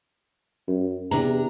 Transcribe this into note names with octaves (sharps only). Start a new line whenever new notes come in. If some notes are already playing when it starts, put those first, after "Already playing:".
F#2
E2 C3 D4 A#5